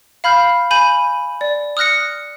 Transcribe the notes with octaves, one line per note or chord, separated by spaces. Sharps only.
F5 B5 F6 G6
G#5 B5 G6 D#7
D5
D#6 F6 F#6 A#6 C#7